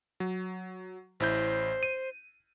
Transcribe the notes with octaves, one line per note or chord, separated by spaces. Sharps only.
F#3
A1 E4 C5 G6
D#7